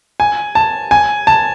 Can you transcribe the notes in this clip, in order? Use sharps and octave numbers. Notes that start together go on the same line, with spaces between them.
G#5
A5
G#5
A5